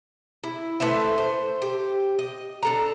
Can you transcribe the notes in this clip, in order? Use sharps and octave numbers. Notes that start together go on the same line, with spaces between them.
E4
A3 B4 C5 E5
C5
G4
D#5
D4 A4 A#5